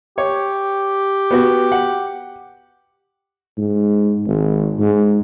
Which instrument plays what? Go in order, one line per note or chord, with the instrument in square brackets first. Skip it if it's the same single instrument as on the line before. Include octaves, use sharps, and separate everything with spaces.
[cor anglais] G4 [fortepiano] C#5
[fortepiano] B3 F#4
F#5
[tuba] G#2
G#1
G#2